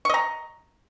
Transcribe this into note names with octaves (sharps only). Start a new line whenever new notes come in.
D#5 A#5 C#6